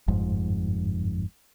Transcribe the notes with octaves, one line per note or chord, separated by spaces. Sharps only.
G1 F2 G#2